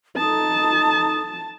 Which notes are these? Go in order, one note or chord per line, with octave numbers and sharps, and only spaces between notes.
D#4 A4 A5 D#6